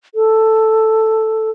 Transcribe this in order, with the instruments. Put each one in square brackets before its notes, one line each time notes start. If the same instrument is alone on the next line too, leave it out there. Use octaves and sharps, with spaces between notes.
[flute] A4